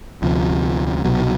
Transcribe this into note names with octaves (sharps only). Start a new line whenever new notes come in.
D2 C3 F3
C2 B2 F#3